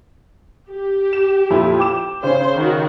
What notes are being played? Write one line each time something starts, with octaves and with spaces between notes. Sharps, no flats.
G4
E7
F2 A#2 E4
G5 D6 E7
C#3 C#4 C5
D#3 F#4